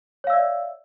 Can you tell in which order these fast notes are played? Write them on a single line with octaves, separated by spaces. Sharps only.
C#5 F5 E6 D5 E5